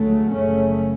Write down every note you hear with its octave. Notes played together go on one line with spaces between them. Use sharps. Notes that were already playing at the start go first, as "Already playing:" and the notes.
Already playing: D2 C#3 F#3 A3
F#1 F#2 C#3 A3 C#4